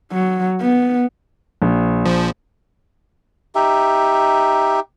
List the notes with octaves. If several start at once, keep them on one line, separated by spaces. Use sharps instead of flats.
F#3
B3
A#1
F3
D#4 G4 E5